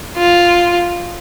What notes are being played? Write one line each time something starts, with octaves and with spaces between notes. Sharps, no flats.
F4